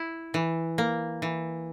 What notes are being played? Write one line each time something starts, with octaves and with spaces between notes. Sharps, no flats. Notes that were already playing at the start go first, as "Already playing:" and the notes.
Already playing: E4
E3
A#3
E3